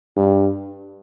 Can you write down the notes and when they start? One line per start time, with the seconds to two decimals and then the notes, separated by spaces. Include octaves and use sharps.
0.16 G2